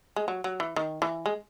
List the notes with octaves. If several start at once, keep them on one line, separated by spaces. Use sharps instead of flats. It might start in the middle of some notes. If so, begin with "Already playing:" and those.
G#3
F#3
F#3
E3
D#3
E3
G#3